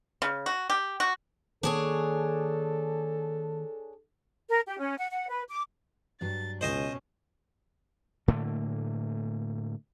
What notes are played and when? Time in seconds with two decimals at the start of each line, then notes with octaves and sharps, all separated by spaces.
0.22 C#3
0.46 F#4
0.70 G4
1.00 F#4
1.63 D#3 A#3 D4 G#4 A4 C#5
4.49 A#4
4.67 G4
4.79 C#4
4.98 F#5
5.12 F#5
5.29 B4
5.50 D6
6.21 G2 F#3 D4 A6
6.61 C#2 B2 C#4 C5 D#5 G#5
8.28 A2 D3 A3 A#3